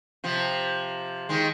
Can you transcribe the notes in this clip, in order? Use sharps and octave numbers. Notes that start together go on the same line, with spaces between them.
C3 F3
D#3 G#3